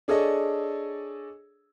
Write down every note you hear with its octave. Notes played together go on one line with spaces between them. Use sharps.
D4 G#4 A4 C#5 D#5